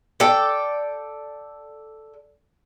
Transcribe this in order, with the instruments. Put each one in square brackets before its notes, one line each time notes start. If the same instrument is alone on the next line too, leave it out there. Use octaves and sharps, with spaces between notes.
[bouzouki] A4 D5 G5